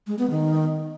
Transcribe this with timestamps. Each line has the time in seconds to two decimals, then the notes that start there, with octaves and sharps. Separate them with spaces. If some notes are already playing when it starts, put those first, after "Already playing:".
0.07 G#3
0.19 B3
0.30 D#3